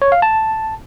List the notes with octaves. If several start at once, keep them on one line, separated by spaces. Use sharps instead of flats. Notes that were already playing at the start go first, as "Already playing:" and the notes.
C#5
F5
A5